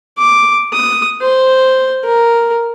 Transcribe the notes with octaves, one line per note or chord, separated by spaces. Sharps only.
D6
D#6
C5
A#4